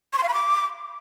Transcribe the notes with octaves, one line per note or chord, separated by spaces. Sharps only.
C#6
C6
F5
B5
D6